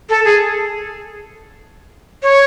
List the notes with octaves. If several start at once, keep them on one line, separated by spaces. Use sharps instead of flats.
A4
G#4
C#5